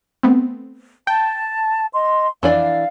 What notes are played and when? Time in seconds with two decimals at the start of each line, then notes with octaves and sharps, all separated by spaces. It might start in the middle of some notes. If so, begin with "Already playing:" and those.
0.23 A3 B3 C4
1.07 G5 A5
1.93 D#5 C6
2.43 F2 E3 D4 D5 F5